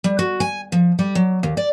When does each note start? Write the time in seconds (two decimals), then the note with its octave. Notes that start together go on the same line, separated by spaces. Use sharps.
0.04 G3
0.19 F#4
0.40 G#5
0.72 F3
0.99 G3
1.15 F#3
1.43 D#2
1.57 D5